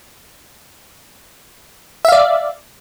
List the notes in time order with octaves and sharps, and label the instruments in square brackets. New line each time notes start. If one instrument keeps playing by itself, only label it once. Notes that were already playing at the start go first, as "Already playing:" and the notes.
[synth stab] E5
F5
D5